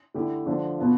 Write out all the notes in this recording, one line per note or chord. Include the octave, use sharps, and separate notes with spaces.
D3 A3 E4 G4
D3 F3 A3 D4
B2 B3 F4